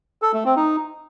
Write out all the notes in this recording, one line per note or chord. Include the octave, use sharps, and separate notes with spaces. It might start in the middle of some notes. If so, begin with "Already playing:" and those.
A4
A3
C4
D#4